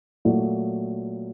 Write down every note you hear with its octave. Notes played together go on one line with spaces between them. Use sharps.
A#2 F#3 A3